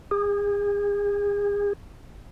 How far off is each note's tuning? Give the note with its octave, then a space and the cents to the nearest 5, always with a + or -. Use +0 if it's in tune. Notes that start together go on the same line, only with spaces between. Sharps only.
G#4 -35